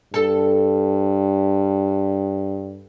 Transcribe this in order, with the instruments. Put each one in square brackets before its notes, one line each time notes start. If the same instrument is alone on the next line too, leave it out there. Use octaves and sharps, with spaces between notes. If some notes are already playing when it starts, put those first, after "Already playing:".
[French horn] G2 [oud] A4